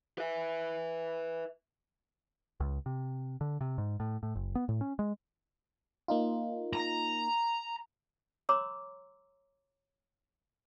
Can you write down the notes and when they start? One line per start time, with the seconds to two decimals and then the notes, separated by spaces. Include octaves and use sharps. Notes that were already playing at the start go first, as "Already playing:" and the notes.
0.18 B4 E5
2.60 C#2
2.86 C3
3.41 D3
3.61 C3
3.78 G#2
4.00 A2
4.23 A2
4.35 F#1
4.55 B3
4.69 A2
4.81 C#4
4.99 G#3
6.08 A#3 D#4 F4
6.73 A#5
8.49 C#5 A#5 C6 D6 E6